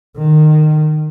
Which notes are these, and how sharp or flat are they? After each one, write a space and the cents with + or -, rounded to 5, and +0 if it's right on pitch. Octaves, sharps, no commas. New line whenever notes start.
D#3 -20